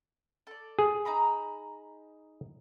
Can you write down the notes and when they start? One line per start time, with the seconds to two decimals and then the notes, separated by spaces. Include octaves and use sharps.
0.47 A4 D5
0.79 G#4
1.05 D#4 A#5 B5